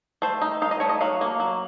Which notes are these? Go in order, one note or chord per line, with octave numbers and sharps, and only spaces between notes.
A3 C5
D#4
D#4 F5
D#5
A3 C#5
D#5
F#3 F5
A#3
F#3